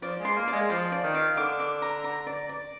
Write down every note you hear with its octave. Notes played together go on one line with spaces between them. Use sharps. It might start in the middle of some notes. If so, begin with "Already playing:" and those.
F3 D5
G#3
C6
A#3
G#3 D5
F3 C6
D5
D#3
F5
D3 D6
D6
A#5
A#5
D5
D5